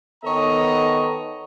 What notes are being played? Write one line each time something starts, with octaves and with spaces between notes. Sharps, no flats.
D#3 B3 A4 C#5 D#5 A#5